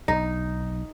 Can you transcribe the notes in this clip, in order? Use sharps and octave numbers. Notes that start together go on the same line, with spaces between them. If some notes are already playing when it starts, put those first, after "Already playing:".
B1 D#4